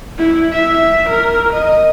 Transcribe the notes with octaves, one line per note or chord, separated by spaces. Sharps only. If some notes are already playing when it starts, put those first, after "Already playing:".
E4
E5
A#4
D#5